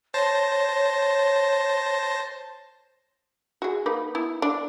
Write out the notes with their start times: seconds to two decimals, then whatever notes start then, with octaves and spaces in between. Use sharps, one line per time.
0.14 C5 C#5 A5 A#6
3.62 F#4 G#4
3.86 A#3 D#4 B4
4.15 B3 E4
4.42 D4